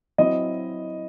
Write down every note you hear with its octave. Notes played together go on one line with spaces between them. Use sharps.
F#3 C4 E4 D#5